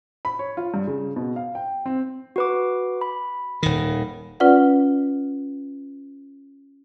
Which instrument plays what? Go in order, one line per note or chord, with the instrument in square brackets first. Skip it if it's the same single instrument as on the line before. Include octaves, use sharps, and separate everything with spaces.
[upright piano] B5
C#5
F4
G2
C#3
B2
F5
G5
C4
[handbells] F#4 B4 D6
B5
[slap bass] D#1 D#3
[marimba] C#4 F4 B4 D5 F#5